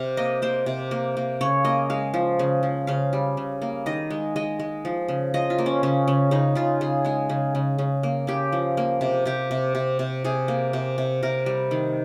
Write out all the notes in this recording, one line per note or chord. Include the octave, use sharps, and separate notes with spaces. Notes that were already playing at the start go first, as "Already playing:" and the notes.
Already playing: C3 F5
A#3 D#5
A#3 C5
C3
A#3
A#3
C#3 C#5
A#3 D#5
G#3 F5
F3
C#3
F3
C#3 F5
G3
C#3
A#3
D#3 D#5
G#3
G#3 D#5
G#3
F3
C#3
F3 D#5
F4
A#3
C#4
C#3 C#4
C#3
C#3 D#4
C#3 F4
C#3 G#4
G#3 G#4
C#3
C#3
C#3
A#3
C#3 G4
F3
A#3
C3
C3 G4
C3
C3
C3
C3 G#4
A#3
C3
C3
C3 A#4
G3
D#3